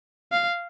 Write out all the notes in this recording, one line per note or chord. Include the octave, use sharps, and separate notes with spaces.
F5